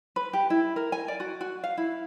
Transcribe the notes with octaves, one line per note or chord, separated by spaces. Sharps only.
B4
G4
E4
A#4
G#5
D5
F#4
F#4
F5
E4